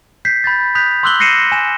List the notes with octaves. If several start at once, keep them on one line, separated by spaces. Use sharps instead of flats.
G6 B6 C7
B5 G6 A6
D#6 F#6 G6 B6 F7
C6 D6 E6 F#6 F#7 G7
F#6 A#6 C7 C#7 D#7 E7
G#5 E7